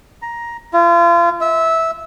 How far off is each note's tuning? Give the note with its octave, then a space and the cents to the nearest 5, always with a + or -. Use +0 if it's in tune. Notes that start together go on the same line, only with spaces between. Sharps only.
A#5 +10
F4 -35
E5 -15